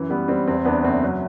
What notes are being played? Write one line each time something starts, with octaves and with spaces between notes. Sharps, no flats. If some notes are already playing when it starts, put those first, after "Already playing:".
Already playing: F#2 E3
G3 B3
G3 C4
E2 C4
E2 B3 D4
F#1 C4
F#3